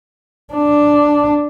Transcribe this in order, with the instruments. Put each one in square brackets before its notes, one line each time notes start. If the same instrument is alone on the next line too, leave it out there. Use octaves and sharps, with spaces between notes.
[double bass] D4